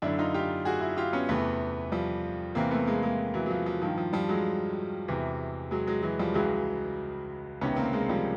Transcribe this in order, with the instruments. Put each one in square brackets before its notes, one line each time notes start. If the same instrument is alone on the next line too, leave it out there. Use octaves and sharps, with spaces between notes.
[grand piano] F#2 D3 D4 E4
D#4 F4
F4 G4
F#4 G#4
E4 F#4
F4 G4
B3 C#4
E2 C3 E3 A3 B3
F3 G3
E2 C3 E3 A#3 C4
A3 B3
G#3 A#3
G#3 A#3
E3 F#3
F#3
F3
F3
G2 D#3 F3
F3
F3 G3
F#3 G#3
E2 C3 E3
F#3 G#3
F#3 G#3
E3 F#3
F3 G3
C#2 C#3 E3 F#3 G#3
C#2 C3 D#3 B3 C#4
A#3 C4
G#3 A#3
F3 G3